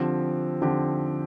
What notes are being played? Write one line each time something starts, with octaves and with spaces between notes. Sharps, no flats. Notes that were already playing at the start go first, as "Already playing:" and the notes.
Already playing: D3 F3 C4 G4
D3 F3 C4 G4